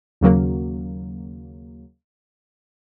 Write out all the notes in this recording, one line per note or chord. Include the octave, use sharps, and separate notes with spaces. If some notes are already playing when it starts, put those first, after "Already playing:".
D#2 C#3 F#3 A#3